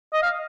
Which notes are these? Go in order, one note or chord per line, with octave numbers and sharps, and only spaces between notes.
D#5
F5